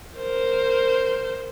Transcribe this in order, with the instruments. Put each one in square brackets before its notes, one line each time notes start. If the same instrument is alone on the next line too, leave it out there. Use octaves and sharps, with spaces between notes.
[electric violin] A#4 C5